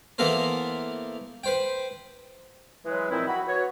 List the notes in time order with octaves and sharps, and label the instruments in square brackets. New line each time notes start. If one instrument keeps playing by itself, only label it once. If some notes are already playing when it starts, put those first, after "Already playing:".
[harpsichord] E3 A#3 B3 A4 A#4 C5
B4 C5 G5
[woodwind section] E3 F#3 G#3 B4
A#2 E3 F3 C4 D#4 E4
F#4 B5
F#4 B4 C#5